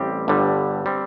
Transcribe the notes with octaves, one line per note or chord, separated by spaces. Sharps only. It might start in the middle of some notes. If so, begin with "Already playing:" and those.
Already playing: A1 G3 C4 G4
G1 G2 D3 G3
G3 C4